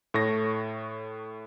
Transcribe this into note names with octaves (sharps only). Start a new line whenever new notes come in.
A2 A3 C#5 C#6 A#6